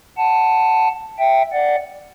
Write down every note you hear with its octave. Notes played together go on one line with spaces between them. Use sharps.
F#5 A5
E5 G5
D5 F#5